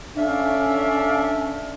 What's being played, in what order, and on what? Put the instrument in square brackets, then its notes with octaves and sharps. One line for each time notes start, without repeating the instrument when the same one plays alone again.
[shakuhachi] C#4 [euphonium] D4 [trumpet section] A4 D5 F5 [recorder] E5